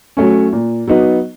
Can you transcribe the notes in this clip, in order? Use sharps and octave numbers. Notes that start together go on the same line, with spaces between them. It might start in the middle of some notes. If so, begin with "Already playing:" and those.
F#3 A3 C#4
A#2
F#3 B3 D#4